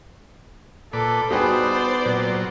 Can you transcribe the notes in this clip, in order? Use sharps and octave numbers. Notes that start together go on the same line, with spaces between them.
A#2 A4 B4 D5
G3 B3 D#4 F#4 G#4 C5 D5
A#2 F#3